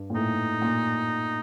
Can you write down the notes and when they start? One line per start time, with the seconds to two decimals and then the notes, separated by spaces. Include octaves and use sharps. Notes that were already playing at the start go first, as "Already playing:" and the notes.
Already playing: G2
0.10 A#2
0.15 A2 D#4
0.62 A#2